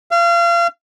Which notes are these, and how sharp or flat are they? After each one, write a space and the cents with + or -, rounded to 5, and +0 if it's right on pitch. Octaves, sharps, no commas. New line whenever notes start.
F5 -35